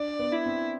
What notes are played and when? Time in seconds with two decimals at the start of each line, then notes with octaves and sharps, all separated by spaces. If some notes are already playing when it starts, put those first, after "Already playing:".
Already playing: D4 D5
0.19 B3
0.32 E4
0.46 C4